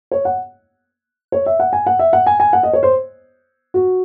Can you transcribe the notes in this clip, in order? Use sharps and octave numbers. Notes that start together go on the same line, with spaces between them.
C#5
F#5
C#5
E5
F#5
G#5
F#5
E5
F#5
G#5
G#5
F#5
D#5
C#5
C5
F#4